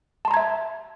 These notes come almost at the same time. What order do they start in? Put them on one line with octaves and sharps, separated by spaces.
A5 C6 A#5 G#6 E5